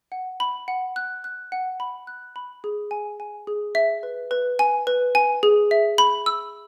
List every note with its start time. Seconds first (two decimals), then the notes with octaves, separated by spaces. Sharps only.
0.12 F#5
0.40 B5
0.68 F#5
0.96 F#6
1.24 F#6
1.52 F#5
1.80 B5
2.07 F#6
2.36 B5
2.64 G#4
2.91 G#5
3.20 G#5
3.47 G#4
3.75 E5
4.03 B4
4.31 B4
4.59 G#5
4.87 B4
5.15 G#5
5.43 G#4
5.71 E5
5.98 B5
6.26 E6